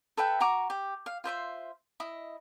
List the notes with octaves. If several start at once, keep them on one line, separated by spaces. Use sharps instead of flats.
A4 B4 E5 G5
F#4 A#5 C#6 D6
G4
F5
F4 C5 E5 C6
E4 D#5